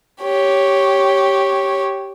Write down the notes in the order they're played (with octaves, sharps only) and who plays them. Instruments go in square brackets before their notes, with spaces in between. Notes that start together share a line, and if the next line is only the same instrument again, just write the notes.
[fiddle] G4 C#5